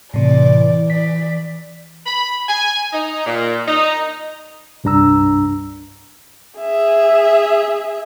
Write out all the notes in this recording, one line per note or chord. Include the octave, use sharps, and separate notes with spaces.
A2 C3 E3 D5
D5 B6
B5
G#5
D#4
A#2
D#4
C2 G2 D4 A#5 E6
G#4 E5